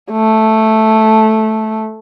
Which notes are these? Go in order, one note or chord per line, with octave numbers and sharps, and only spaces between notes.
A3